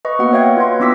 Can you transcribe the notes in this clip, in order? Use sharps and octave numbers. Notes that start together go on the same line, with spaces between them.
B4 D#5 C#6
A#3 B3 F#4 F#5
C#5 E5 F5 G5 G#6
F4 B4 C6
B3 D4 F4 D6 E6 B6